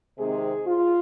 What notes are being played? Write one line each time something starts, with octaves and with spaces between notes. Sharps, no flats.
C3 D#3 G#3 C4 G#4
F4